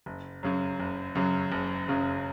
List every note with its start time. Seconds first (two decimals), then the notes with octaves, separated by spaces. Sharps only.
0.06 F#1
0.43 F#2 C#3 F#3
0.80 F#1
1.15 F#2 C#3 F#3
1.52 F#1
1.88 F#2 C#3 F#3